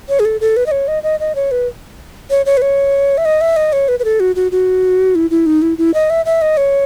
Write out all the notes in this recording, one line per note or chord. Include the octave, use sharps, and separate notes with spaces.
C#5
G#4
A4
A4
B4
D#5
C#5
D#5
D#5
D#5
C#5
B4
C#5
C#5
B4
C#5
E5
D#5
E5
D#5
C#5
B4
B4
A4
F#4
F#4
F#4
E4
E4
D#4
E4
E4
D#5
E5
E5
D#5
C#5